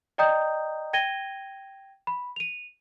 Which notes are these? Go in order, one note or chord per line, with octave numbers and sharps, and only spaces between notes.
D5 D#5 G5 A#5 D#6 G6
G5 G#6 A#6 D#7 G7
B5
D#7 F7